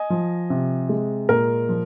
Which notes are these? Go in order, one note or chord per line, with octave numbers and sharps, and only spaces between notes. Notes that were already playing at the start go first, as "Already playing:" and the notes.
Already playing: D#5 G#5
F3
C3
G#3
A#2 A#4
F3